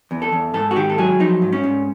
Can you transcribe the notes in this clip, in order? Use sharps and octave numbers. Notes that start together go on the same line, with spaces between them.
E2
A4
E2
G#2 A4
F#4
D#3 G4
A4
F#3 G#4
F3 D#4
G#2
C#4
G#2